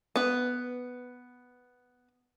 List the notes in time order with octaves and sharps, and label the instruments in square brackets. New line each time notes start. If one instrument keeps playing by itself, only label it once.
[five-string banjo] B3 B4